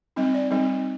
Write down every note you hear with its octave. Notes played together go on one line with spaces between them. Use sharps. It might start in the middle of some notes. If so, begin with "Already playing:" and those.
G3 C4 D#4 D#5
D5
G3 C4 D#4